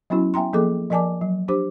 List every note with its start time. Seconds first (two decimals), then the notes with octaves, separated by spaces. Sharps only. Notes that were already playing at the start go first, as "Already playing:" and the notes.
0.10 F#3 B3 C#4 E4 F#4
0.34 B3 E5 G5 A#5 C6
0.53 F3 A#3 G#4 A4 D6
0.90 F3 A#4 D5 G#5 A5 D6
1.21 F#3
1.48 D4 G4 C5 D6